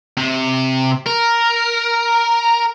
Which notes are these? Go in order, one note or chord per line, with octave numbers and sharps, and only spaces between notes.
C3
A#4